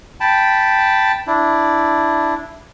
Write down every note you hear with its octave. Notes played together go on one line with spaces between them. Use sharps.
G5 A5 B5
D4 E4